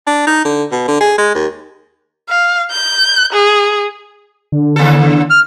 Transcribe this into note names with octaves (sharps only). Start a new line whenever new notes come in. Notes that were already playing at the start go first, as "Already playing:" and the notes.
D4
D#4
D3
B2
D3
G#4
G#3
D#2
F5
G6
G#4
D3
D#2 A4
F6